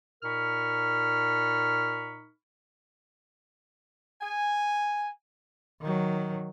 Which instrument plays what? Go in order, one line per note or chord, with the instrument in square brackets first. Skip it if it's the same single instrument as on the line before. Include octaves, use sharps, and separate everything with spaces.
[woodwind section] A#2 D#4 A#4 B5 C#6 F6
[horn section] G#5
[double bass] D#3 F#3